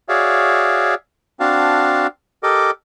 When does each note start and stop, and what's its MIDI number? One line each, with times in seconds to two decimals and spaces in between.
0.09 0.94 66
0.09 0.94 68
0.09 0.94 73
0.09 0.94 74
0.09 0.94 76
0.09 0.94 77
1.40 2.07 60
1.40 2.07 62
1.40 2.07 66
1.40 2.07 77
1.40 2.07 81
2.43 2.71 67
2.43 2.71 69
2.43 2.71 70
2.43 2.71 75
2.43 2.71 86